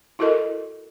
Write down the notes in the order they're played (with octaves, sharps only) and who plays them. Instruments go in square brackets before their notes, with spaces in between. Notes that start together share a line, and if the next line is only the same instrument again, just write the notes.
[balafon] E4 F#4 A4 A#4 D#5